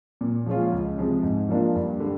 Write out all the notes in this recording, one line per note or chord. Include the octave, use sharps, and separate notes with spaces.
A#2
F3 G#3 C#4 F4
C#2
C3 F3 G#3
G#2
F3 A#3 D4 F4
G2
D3 G3